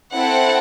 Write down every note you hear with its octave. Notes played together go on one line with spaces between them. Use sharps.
C4 E4 A4 F#5